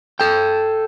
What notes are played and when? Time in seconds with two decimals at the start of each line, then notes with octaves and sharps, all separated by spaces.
0.20 A4 G5